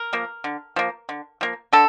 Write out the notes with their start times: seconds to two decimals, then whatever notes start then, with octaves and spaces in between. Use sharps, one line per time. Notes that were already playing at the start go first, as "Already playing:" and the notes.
Already playing: A#4
0.13 F3 A#3
0.44 D3
0.76 F3 A#3
1.09 D3
1.41 F3 A#3
1.73 D3 A4